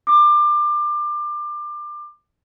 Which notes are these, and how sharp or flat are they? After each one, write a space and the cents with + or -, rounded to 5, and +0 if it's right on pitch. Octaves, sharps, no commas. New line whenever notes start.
D6 +25